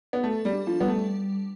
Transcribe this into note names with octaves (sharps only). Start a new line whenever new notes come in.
B3
A3 A4
G3
D4
F3
G3 B3
A3